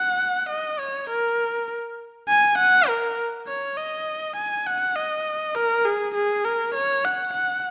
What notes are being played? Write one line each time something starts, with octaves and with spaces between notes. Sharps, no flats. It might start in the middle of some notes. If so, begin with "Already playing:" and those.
Already playing: F#5
D#5
C#5
A#4
G#5
F#5
A#4
C#5
D#5
G#5
F#5
D#5
A#4
G#4
G#4
A#4
C#5
F#5
F#5